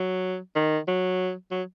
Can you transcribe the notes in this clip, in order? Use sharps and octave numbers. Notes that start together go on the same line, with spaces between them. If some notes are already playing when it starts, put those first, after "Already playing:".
Already playing: F#3
D#3
F#3
F#3